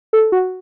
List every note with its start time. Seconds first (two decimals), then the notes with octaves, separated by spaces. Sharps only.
0.13 A4
0.32 F#4